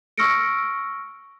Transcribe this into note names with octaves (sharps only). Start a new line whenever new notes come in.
C#6 E6 F6 A#6 C#7 D7